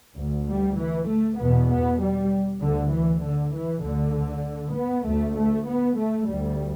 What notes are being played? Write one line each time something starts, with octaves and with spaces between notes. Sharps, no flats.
D2
G3
E3
A3
E2 B2 B3
B3
G3
D2 D3
E3
D3
E3
D2 D3
B3
D2 A3
A3
B3
A3
D2 G3